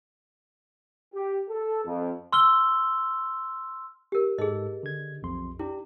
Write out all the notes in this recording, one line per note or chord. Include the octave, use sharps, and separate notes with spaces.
G4
A4
F2
C6 E6 F6 G7
G4 A#4
G#2 G#4 A4 D#5
D3 G#6
B1 F2 C6
D4 E4 G4